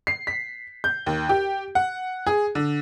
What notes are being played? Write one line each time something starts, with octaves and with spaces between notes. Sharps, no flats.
C7
B6
G6
D#2
G4
F#5
G#4
D3